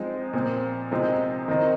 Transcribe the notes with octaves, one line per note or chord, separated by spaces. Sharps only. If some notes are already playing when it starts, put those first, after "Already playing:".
Already playing: F3 G#3 C4 D#4
A#2 F3 C4
C3 F3 G#3 C4 D#4
D#3 C4 D#4